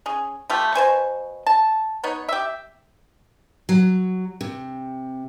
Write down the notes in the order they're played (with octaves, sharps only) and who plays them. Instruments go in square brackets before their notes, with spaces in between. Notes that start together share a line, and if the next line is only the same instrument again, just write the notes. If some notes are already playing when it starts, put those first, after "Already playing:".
[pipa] C#4 G#4
A3 F4 G4
B2 C5 G#5 C#6
A5
B3 D#4 C#5
G4 E5
[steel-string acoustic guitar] F#3
C3